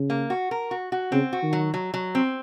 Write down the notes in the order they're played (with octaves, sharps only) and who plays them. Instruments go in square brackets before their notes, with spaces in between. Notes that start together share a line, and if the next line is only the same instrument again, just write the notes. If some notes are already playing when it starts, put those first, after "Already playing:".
Already playing: [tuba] C#3
[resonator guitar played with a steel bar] A#3
F#4
A#4
F#4
F#4
[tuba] C#3 [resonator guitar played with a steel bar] C4
[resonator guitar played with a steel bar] F#4
[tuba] D#3
[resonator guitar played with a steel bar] F#3
F#3
F#3
C4